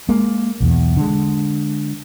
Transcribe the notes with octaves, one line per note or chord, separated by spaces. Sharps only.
G#3 A#3
B1 E2
D3 G#3